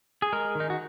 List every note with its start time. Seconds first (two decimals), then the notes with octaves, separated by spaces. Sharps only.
0.22 G#4
0.33 G#3 A#4
0.55 D#3
0.60 D#4
0.70 F#4